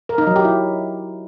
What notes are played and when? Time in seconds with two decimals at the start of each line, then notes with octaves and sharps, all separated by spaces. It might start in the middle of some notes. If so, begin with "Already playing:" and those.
0.09 A#4
0.18 D#4
0.27 F#3
0.36 G4
0.45 E4